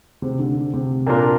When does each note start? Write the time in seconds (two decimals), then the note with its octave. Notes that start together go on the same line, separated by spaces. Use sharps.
0.22 C3
0.39 D3
0.73 C3
1.07 A#2 A#3 D4 F4 A#4